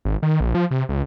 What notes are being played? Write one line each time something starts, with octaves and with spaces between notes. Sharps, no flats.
G#1
D#3
A#1
F3
C3
C#2